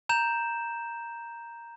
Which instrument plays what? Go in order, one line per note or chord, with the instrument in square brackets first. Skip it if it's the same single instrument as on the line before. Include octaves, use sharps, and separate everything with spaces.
[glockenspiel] A#5 G6 E7